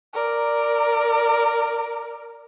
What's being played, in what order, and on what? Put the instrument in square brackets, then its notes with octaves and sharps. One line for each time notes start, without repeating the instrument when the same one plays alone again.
[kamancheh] A#4 D5